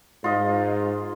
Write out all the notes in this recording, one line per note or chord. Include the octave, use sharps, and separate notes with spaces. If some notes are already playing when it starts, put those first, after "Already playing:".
G#2 F4 D#5